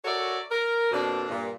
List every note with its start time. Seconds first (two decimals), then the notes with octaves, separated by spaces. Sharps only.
0.05 F#4 A4 A#4 C#5 D5 E5
0.50 A#4
0.92 F2 B2 A#3 C4 D4
1.29 G2 A#2